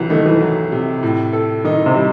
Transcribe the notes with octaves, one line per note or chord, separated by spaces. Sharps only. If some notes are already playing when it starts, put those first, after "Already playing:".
Already playing: C2 E3 F#3
D#3 A3
E3
F#3
C3
A2
A4
D#3 D#4
C3
G3